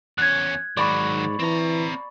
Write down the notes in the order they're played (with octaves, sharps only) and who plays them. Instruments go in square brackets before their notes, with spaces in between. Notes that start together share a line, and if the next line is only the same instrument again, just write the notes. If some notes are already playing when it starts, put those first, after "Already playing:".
[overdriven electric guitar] E2 C#4 [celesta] F#6 G#6
[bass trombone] G#2 [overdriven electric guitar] D#3 F#3 [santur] D5 B5 C#6
[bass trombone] E3 [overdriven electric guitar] C4 A#5